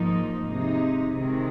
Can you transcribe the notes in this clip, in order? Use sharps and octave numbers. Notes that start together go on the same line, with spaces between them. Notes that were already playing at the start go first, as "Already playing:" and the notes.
Already playing: G#2 F3 A#3 D#4
C3 G#3 D#4
C3 D#3 G#3